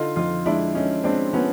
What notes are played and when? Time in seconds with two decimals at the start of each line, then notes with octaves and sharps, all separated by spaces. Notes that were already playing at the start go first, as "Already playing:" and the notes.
Already playing: D3 D#4 F4
0.16 F2 D#4 F4
0.46 G#3 D4 E4
0.75 G#3 C#4 D#4
1.04 G#3 C4 D4
1.33 F3 B3 C#4